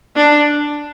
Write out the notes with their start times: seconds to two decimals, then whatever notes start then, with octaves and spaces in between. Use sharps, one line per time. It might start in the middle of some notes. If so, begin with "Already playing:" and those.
0.16 D4